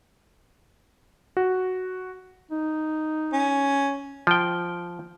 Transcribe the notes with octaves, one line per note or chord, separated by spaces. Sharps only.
F#4
D#4
C#4
F3 G5